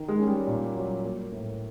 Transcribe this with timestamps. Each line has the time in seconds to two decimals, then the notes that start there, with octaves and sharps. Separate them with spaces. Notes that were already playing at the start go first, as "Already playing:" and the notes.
Already playing: D#3
0.09 G#3
0.19 C#4
0.27 G3
0.47 A#2
0.75 F#3
1.04 A#3
1.32 A2